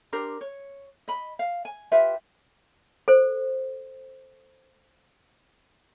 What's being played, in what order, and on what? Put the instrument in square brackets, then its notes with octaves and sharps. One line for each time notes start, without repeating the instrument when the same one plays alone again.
[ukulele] D4 G4 A#4 C5
C#5
D#5 B5
F5
G#5
F4 G4 B4 E5
[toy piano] A4 C5